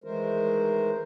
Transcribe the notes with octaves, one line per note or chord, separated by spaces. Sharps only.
D#3 E3 G#3 A3 A#4 C5